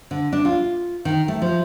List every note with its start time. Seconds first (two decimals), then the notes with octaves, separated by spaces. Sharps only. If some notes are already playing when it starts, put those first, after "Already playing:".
0.11 D3
0.33 D4
0.45 F4
1.05 D#3
1.28 A3
1.42 F3